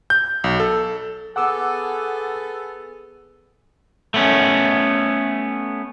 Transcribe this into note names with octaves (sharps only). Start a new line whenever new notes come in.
G6
B1
A4
B3 G#4 A4 F#5 D6 E6
A3 B3 C#4